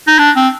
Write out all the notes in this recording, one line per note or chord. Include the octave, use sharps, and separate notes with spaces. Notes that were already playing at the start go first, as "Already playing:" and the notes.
D#4
D4
C4